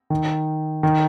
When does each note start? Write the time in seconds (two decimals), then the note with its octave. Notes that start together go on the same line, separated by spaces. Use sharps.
0.10 D#3
0.83 D#3